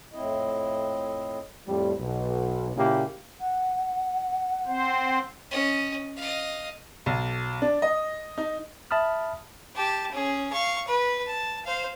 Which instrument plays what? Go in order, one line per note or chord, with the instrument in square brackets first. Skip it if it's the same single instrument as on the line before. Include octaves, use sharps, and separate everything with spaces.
[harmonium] F2 A2 C4 E4 D#5
[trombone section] F2 A2 G3
B1
A#2 C#3 A#3 E4 G4
[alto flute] F#5
[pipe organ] C4 C5
[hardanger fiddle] C#4 D#5
D#5 F5
[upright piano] B1
D4
D#5
D#4
[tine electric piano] E5 A5 B5 D#6 F6
[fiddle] G4 A5
C#4 G#4
F5 C#6
B4
A5
C5 F5